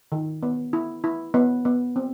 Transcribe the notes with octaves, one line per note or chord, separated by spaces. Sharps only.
D#3
B3
E4
E4
B3
B3
C4